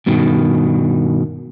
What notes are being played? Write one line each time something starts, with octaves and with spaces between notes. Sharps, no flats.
G2 B2 D#3